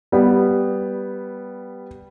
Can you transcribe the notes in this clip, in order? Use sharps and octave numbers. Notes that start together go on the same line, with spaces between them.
G3 B3